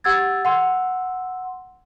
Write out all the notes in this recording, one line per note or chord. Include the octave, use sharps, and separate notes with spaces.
G4 F#5 E6 G#6 A6
F#5 C6 E6